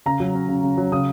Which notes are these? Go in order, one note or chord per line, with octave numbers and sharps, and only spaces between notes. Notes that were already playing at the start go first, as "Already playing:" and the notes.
C#3 A#5
F#3
C#4
C#3
C#3
F#3
C#3 D#6